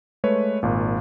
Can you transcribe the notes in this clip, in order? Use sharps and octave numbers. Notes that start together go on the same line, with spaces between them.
G#3 A3 B4 C#5
G#1 A#2